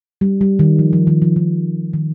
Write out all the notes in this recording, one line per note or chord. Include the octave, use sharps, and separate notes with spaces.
G3
G3
D#3
F3
F3
D#3
F3
D#3
D#3